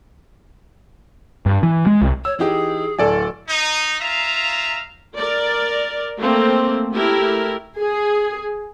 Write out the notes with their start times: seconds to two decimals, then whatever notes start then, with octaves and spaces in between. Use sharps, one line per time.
1.46 G2
1.63 E3
1.86 G#3
2.02 C2
2.25 C#5 E6
2.39 E3 D#4 G4 G#4
2.98 D1 A4 D5 G#5
3.48 D#4
4.00 D#4 F4 E5 F5 A#5
5.16 A#4 D5
6.18 A3 A#3 C4
6.91 A3 E4 G4 A#4
7.80 G#4